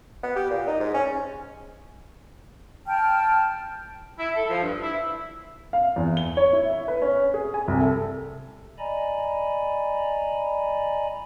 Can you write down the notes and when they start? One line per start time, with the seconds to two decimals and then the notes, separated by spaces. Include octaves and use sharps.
0.23 B3
0.36 G4
0.50 A#2
0.67 D#4
0.80 G#2
0.94 C#4
2.87 G5 A5 F6
4.18 E4
4.35 A4
4.48 F3
4.61 G2
4.81 E4
5.73 F5
5.96 E2
6.17 G7
6.37 C#5
6.53 E4
6.70 E5
6.88 B4
7.02 C#4
7.34 G#4
7.54 G#5
7.68 C2
7.81 A4
8.79 D5 D#5 G#5 A#5 B5